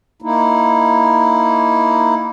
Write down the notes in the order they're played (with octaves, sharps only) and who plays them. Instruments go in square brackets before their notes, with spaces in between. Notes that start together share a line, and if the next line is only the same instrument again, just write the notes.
[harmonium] A#3 D#4 E4